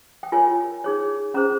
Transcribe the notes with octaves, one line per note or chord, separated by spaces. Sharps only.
G5
F4 A#4 C#5 G#5
D#4 G#4 C#5
C#4 G#4 C5 A#5